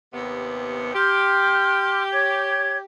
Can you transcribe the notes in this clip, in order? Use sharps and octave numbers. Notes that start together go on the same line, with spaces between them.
D#2 C3 B3
G4 C6 F6 G6
C#5 G#6